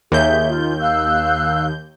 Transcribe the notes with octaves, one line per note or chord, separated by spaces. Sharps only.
D#2 G#4 C#5 E5 G6
F4
F5 E6 F#6